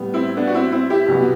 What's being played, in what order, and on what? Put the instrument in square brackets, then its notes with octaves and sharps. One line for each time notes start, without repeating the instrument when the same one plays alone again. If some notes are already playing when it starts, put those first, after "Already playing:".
Already playing: [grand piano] A2 G3 B3
[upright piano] C4 E4
B3 D4
F#4
C4 E4
C4 E4
E4 G4
[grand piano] C2 B2 F#3 B3